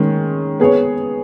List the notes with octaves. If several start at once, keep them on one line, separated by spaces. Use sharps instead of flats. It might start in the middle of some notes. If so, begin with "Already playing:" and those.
Already playing: D#3 G#3 C#4
B3 G#4 C#5